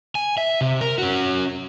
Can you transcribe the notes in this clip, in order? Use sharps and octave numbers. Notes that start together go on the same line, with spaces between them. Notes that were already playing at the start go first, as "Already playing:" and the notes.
G#5
E5
C3
A#4
C#4 F#4